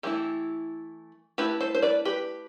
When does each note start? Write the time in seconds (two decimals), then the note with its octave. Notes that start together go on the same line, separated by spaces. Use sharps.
0.03 E3 A3 E4 G4
1.38 A3 E4 G4 B4
1.60 A4 C5
1.75 C5
1.82 B4 D5
2.05 G4 B4